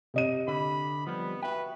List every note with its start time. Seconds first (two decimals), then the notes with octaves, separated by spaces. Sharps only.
0.14 C3 D#5 D#7
0.48 D3 B5
1.07 F3 G3 B3
1.42 F#4 B4 E5 G5